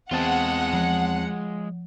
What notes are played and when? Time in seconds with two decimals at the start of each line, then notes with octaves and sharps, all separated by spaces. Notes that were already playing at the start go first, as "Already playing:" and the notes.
0.11 E2 G#3 C4 F4 F#5 A5
0.73 F3